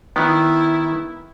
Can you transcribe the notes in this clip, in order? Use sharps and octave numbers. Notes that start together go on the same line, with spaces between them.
D#3 B3 E4